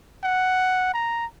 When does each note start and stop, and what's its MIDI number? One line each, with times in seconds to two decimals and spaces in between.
0.23 0.92 78
0.94 1.26 82